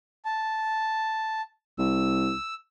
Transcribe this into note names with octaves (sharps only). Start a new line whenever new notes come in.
A5
C2 E6